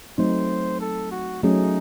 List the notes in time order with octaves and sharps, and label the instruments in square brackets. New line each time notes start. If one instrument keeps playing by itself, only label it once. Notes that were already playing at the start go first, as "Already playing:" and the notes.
[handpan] F#3 A3 C4 D#4 [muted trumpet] C5
[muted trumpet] A4
F#4
[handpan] F#3 A3 C#4 G#4 [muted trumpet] D#4